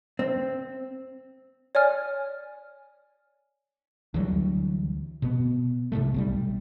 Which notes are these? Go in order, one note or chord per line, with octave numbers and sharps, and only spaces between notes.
C4
C#5 D5 G#5 F6
D2 E3 F#3 G3
B2 B3
C2 G#2 C3 A3
B1 F#3 G3